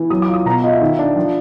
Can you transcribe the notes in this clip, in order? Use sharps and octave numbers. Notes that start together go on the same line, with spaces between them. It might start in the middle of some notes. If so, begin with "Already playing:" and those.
Already playing: E3
F#3 D#6
D6
F4
D#6
B2 A#5
F4 D#5
E5
D#3
D4
F3